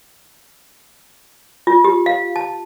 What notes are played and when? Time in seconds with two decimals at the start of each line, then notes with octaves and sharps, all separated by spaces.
1.67 F4
1.84 G4
2.06 F5
2.36 A5